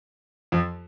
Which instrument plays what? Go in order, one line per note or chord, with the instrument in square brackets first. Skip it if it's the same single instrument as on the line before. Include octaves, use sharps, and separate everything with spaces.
[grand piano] F2 F3